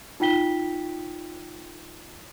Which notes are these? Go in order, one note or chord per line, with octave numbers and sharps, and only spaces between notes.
D#4 F4 G5 B6 G7